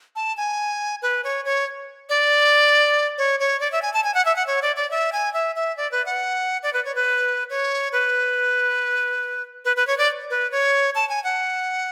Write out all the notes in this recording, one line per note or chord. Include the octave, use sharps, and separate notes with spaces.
A5
G#5
B4
C#5
C#5
D5
C#5
C#5
D5
E5
G#5
A5
G#5
F#5
E5
F#5
C#5
D5
D5
E5
G#5
E5
E5
D5
B4
F#5
D5
B4
C#5
B4
C#5
B4
B4
B4
C#5
D5
B4
C#5
A5
G#5
F#5